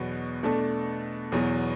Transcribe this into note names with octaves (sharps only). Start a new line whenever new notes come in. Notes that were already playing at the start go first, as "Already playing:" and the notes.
Already playing: E2 B2 F#3 B3 F#4
B2 A3 D4 A4
E2 B2 F#3